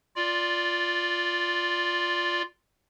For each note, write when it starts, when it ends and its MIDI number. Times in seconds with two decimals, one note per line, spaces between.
0.16 2.42 65
0.16 2.42 74